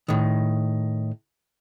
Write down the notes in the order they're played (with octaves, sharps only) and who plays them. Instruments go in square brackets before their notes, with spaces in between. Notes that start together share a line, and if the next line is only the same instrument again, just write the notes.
[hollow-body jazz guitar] A2 D#3